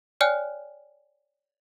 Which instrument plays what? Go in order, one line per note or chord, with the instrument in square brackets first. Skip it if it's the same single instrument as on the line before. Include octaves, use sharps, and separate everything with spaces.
[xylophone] C#5 D5 G5 G#5 F6 F#6